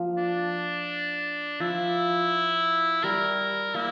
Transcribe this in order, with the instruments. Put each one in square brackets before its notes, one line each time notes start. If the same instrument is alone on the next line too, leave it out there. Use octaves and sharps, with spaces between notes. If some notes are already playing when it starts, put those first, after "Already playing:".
Already playing: [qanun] F3 A#3
[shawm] D4
[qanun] F3 [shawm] E4
[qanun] G3 [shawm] A#4
[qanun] A#3 [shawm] E4